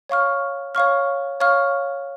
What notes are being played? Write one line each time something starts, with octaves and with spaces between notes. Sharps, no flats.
C#5 F5 C#6 F6
C#5 F5 C#6 F6
C#5 F5 C#6 F6